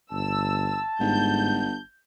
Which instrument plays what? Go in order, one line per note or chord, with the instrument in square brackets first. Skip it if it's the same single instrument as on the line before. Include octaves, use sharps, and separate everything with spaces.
[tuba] G1 [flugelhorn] A5 [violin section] E6
[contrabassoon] G1 [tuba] G#2 [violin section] G6